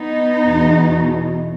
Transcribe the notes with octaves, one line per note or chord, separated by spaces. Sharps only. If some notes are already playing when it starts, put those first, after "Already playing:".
Already playing: B3 D#4
E2 B2